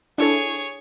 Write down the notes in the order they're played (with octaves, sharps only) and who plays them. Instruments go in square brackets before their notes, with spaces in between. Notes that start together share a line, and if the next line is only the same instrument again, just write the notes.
[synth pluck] D4 E4 A4 [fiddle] G#4 C#5